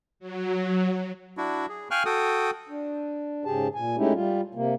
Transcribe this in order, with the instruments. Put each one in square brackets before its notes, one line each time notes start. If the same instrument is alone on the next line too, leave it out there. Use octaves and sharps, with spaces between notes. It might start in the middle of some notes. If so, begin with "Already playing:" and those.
[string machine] F#3
[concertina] D4 E4 F#4
G#4
F5 G5 G#5 C#6 F6 F#6
F#4 A4 G5 D#6
[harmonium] D4
G#2 C#3 G4 G#4 A5
A#2 G#5
G#3 A3 C#4 D#4 E4 G4
G3 F4
C3 A#3